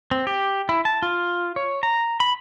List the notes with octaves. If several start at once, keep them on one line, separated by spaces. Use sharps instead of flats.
C4
G4
E4
A5
F4
C#5
A#5
B5